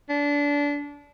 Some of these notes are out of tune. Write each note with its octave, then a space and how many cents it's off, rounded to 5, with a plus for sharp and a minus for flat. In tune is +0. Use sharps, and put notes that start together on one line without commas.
D4 -25